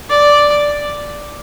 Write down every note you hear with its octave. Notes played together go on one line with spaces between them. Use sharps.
D5